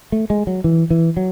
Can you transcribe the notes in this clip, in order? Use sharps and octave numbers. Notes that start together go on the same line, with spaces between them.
A3
G#3
F#3
E3
E3
F#3